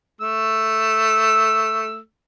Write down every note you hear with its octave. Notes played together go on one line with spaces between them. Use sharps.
A3 E6